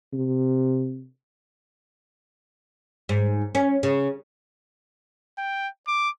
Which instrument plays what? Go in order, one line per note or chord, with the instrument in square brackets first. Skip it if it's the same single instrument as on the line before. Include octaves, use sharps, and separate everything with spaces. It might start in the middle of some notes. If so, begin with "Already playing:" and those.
[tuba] C3
[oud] G#2
C#4
C#3
[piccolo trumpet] G5
D6